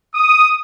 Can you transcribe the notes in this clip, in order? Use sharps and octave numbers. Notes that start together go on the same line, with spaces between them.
D#6